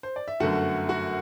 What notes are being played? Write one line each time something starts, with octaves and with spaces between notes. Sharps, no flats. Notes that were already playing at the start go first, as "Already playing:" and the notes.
C5
D5
E5
G1 F#2 D3 A3 F#4 F#5
F#4 F#5